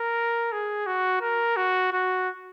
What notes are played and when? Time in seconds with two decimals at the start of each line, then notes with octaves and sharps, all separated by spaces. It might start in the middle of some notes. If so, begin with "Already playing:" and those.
Already playing: A#4
0.52 G#4
0.87 F#4
1.22 A#4
1.56 F#4
1.93 F#4